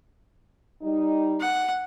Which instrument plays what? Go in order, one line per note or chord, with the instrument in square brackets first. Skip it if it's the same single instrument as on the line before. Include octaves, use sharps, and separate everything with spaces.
[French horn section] G3 D#4
[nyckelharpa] F#5